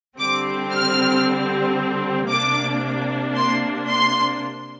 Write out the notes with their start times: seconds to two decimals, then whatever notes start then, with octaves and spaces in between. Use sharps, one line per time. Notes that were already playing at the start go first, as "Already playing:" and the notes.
0.18 D3 G3 C4 D6
0.72 F6
2.30 C3 A#3 D4 D6
3.36 C6
3.89 C6